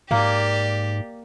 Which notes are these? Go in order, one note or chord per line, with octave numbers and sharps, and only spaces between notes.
G#2 A#3 G4 D5